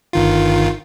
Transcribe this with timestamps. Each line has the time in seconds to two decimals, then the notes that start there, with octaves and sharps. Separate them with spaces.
0.13 G1 D#3 F4